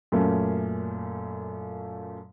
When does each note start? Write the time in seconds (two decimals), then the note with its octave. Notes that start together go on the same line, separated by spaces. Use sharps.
0.12 F#2 A#2 A3 A#3 C#4